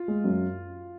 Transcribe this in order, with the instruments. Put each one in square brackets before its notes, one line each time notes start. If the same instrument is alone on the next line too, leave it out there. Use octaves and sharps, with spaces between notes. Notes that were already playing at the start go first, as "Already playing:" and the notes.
Already playing: [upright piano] F4
[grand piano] G#3
F#2